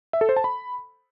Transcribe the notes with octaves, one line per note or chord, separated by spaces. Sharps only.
E5
A4
C5
A5
B5